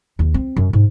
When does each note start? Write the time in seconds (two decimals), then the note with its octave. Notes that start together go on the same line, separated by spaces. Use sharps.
0.19 D#2
0.34 C4
0.57 F#2
0.73 G#2